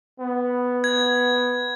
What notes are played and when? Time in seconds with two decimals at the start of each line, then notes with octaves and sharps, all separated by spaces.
0.20 B3
0.84 G#6